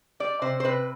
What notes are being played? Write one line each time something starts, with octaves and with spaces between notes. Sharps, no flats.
G3 D5
C3 C5
C5
C3 B4